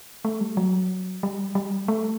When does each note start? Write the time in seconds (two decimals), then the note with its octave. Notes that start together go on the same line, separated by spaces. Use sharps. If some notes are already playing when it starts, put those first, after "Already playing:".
0.25 A3
0.41 G3
0.57 F#3
1.23 G3
1.55 G3
1.88 A3